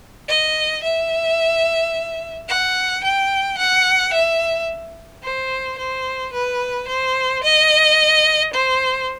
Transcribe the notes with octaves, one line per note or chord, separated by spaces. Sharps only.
D#5
E5
F#5
G5
F#5
E5
C5
C5
B4
C5
D#5
C5